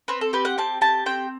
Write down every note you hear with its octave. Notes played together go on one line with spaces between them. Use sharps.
C4 B4
A4
G4 B4
F#5
C4 A5
G4 A5
C4 G5